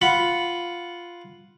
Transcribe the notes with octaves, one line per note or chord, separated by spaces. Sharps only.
F4 F#5 B5